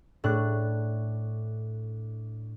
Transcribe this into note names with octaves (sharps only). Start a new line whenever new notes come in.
A2 D4 F#6